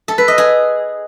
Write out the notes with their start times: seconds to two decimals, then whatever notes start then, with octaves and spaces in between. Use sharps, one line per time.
0.08 A4
0.18 B4
0.28 D#5
0.38 G#4